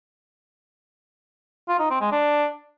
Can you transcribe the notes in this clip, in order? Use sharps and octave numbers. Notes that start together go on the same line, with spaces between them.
F4
D#4
C4
G#3
D4